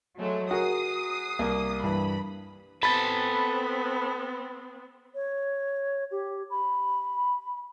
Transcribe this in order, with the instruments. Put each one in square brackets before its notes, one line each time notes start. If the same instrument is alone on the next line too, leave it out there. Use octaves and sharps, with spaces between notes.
[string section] F#3 G#3 A3
[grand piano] F#4 G#4 A#4 [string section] D#6 C7
[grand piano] C2 A#3
[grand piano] G2 E3 [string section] B5
[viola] B3 C4 [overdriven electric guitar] A4 B4 [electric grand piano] B5 A6
[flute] C#5
G4
B5